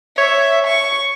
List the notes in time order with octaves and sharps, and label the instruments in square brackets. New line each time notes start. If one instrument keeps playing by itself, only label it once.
[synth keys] C#5 [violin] E5
[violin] C#6